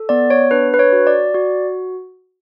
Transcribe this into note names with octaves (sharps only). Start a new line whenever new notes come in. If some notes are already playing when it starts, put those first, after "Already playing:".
Already playing: A4
B3 D5
C#5
D4 B4
B4
C#5
F#4
D5
F#4